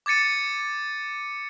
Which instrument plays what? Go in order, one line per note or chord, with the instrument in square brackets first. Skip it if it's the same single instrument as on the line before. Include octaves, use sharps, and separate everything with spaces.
[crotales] D6 G#6 A6 C#7 D#7